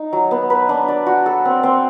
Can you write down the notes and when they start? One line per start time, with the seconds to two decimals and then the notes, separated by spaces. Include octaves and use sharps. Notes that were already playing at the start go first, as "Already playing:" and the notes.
Already playing: D#4
0.13 F#3
0.31 B3
0.50 B4
0.69 D4
0.88 D5
1.06 F#4
1.26 A4
1.45 C4
1.63 C4